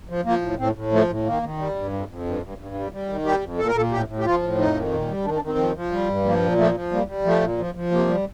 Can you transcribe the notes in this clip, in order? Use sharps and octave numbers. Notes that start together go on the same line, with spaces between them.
F3
F3 A#3
A2
A2 C4
A2
F3 A3
A2
D#3 A#3
D#3
G3
G2
F2
F2
G2
G2
G2
G3
G3
D#3
G3 G4
F2
A#2 A4
A#4
A#2 A4
A2 G4
A2
G4
F3 F4
A2
F2 D#4
D#3
A#2
G3
D#3 D4
D4
D#3
C4
F3
F3
G3
G2
F3 A#3
A#2
F3 A3
F3
G3 A#3
G3
F3 A3
A#2
F3
F3
C3 A#3
G3